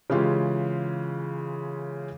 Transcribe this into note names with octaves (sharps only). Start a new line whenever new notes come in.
C#3 E3 G#3 F4 G4